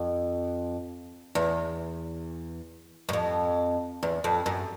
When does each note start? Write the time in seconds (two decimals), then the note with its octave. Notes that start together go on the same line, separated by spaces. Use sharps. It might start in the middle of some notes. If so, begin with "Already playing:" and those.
Already playing: F2
1.35 E2
3.09 F#2
3.13 F2
4.03 E2
4.24 F2
4.46 F#2